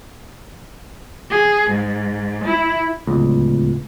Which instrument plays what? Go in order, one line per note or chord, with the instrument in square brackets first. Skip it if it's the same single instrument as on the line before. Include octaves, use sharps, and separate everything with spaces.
[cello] G#4
G#2
E4
[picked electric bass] D1 G1 C#2